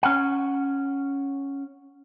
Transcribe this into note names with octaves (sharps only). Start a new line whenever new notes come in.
C#4 F#5